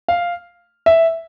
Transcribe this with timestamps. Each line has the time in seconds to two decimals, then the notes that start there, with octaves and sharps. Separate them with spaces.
0.08 F5
0.86 E5